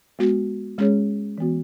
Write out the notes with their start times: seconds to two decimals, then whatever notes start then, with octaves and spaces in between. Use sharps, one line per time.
0.19 G#3 B3 F#4
0.78 G#3 C#4 G#4 C#5
1.38 E3 B3 F#4